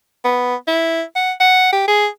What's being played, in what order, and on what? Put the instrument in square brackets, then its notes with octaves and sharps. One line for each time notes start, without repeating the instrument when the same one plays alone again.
[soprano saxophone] B3
E4
F#5
F#5
G4
G#4